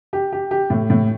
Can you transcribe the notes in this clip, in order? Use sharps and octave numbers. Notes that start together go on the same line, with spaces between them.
G4
G4
G4
A2
A2